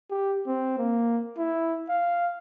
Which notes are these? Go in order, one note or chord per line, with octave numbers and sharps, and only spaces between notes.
G4
C4
A#3
E4
F5